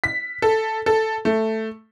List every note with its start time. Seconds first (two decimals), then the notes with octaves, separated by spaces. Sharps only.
0.04 B6
0.42 A4
0.86 A4
1.25 A3